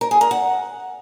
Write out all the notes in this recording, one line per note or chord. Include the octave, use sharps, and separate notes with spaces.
A#4
G#4
A#4
F#5